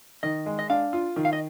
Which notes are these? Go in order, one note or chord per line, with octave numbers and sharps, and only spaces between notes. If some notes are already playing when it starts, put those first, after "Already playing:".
D#3 D#5
G#3
D#5
D4 F5
F4
D#3
F5
D#5